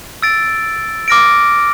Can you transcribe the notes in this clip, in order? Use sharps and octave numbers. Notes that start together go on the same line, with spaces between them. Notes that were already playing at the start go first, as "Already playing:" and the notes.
E6 A6 D7
D6 F6 A#6 D7